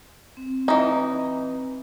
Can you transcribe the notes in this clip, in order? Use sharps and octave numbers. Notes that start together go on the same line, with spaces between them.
C4
E3 D#4